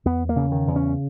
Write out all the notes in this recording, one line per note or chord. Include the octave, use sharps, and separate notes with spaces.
E2 B3
A#3
C#3
D#3
E2
C#4